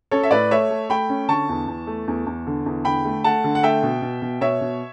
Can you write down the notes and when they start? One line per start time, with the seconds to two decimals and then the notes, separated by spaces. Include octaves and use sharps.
0.11 C#4 A4 C#5
0.23 E5
0.31 A2 B4 D5
0.51 A3 C#5 E5
0.70 A3
0.90 A3 G5 B5
1.09 C#4
1.28 D3 A5 C#6
1.49 E2
1.68 E2
1.87 A3
2.08 E2
2.27 E2
2.47 D3
2.66 E2
2.85 D3 G5 B5
3.05 A3
3.24 A3 F#5 A5
3.44 D3
3.55 F#5
3.63 A3 E5 G5
3.83 B2
4.02 B2
4.22 B2
4.41 B2 C#5 E5
4.61 B2